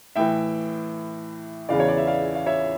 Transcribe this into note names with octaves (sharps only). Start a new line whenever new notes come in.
A2 E3 E5 G5
E2 C#3 E3 D5 F5
C#5
D5
E5
D5 F5
F5
C#5 E5